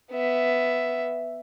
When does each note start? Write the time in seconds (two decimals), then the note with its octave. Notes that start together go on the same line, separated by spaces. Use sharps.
0.11 B3 E5